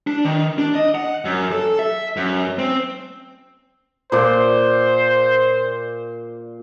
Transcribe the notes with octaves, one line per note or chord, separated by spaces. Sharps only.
D4
D#3
D4
D#5
F#5
F#2
A4
E5
F#2
C4
A#2 C5 D5